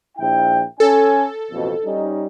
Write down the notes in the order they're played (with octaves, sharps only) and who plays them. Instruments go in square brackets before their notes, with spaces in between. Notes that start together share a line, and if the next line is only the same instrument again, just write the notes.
[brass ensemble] A#1 E4 G5
[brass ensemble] C#4 G#5 [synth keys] A4
[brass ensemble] A1 F2 B2
G3 C#4 D#4